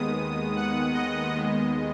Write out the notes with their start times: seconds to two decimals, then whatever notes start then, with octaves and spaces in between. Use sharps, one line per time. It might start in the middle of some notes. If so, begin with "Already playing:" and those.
Already playing: D#2 D#3 G#3 B3 D#6
0.56 F#5
0.94 D#5
1.31 D#2 D#3 G#3 B3 D#5